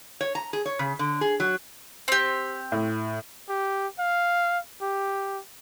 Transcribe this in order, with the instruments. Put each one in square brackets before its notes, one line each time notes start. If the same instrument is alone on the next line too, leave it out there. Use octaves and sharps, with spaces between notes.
[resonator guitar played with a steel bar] C#5
A#5
G#4
C#5
C#3
D3
G#4
F#3
[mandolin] C4 G4
[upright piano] A2
[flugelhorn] G4
F5
G4